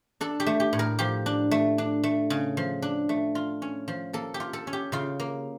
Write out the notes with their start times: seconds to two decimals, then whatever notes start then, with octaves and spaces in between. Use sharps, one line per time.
0.21 D4 A4
0.40 G4
0.46 A3
0.60 G4
0.73 A2
0.79 A#4
0.99 F3 G4
1.26 D4
1.51 A3
1.78 D4
2.04 A3
2.30 C#3
2.57 F3
2.82 D4
3.09 A3
3.35 F4
3.62 C#4
3.88 F3
4.13 A#3 A4
4.34 G4
4.40 F4
4.53 A4
4.67 C#4
4.73 G4
4.92 C#3 F4
5.20 A#3